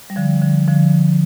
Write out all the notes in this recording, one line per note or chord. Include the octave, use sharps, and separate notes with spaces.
G3
D3 F3
D3 F3
D3 F3